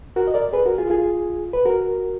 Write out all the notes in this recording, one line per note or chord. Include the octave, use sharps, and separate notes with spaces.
F#4 A#4
D#5
A#4 D5
G#4 B4
F#4 A#4
F4 G#4
F4 G#4
B4
F#4 A#4